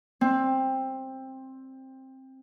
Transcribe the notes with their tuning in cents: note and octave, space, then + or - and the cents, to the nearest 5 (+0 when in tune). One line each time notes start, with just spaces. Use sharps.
C4 +15